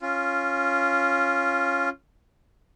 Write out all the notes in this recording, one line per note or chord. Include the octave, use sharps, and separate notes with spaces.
C#4 F4